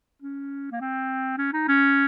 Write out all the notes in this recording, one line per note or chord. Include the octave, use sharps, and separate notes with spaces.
C#4
A#3
C4
C#4
D#4
C#4